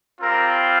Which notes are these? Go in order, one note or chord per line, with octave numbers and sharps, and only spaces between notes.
G3 C4 F4 A#4